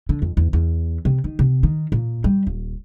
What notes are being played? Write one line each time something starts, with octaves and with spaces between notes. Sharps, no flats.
D3
F2
E2
E2
C3
D#3
C3
D#3
A#2
G3
D#1